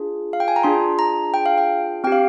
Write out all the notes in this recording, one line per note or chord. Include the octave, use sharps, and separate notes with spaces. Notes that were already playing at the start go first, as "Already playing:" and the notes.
Already playing: D4 F4 G#4
F5
G5
G#5
A#5
D4 F4 G#4 C6
A#5
G5
F5
G5
C4 G4 G5
F5